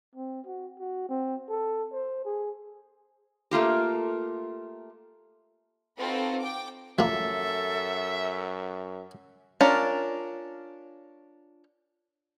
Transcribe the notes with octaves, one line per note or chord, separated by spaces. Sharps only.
C4
F#4
F#4
C4
A4
C5
G#4
A3 A#3 F4 G4
C4 D#4 F4 F#4 A4 B4
G5 D6
F#2 F3 A#3 A4 E5
C#4 D4 F4 A#4